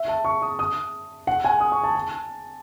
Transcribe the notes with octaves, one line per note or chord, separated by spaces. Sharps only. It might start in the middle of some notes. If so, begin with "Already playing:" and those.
Already playing: E5
A5
C#6
D#6
D#6
F#5
G#5
D#6
C#6
A5
A5